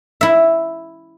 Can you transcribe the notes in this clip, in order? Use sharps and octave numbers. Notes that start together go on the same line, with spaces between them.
E4 E5